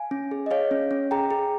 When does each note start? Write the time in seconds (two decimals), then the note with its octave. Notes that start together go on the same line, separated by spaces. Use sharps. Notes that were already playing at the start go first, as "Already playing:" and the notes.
Already playing: F5 G#5
0.11 C#4
0.31 G#4
0.46 D#5
0.51 G#4 C#5 F5
0.71 C#4
0.91 C#4
1.11 G#4 G5 A#5
1.31 G#4